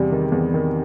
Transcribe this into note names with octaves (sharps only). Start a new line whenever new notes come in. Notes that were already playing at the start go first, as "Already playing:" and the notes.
Already playing: E2 C3 G3
D#3
E2
D#3